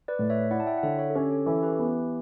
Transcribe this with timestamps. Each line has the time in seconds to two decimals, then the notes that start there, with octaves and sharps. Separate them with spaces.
0.08 B4 D5
0.19 A2
0.30 C#5 E5
0.50 E4 D5 F#5
0.60 A5
0.67 E5 G5
0.78 F#5
0.83 D3 C#5 E5
0.99 A4 C#5
1.10 A4
1.15 C#4 G4
1.31 A4
1.46 E3 A4
1.63 G4 B4
1.79 B3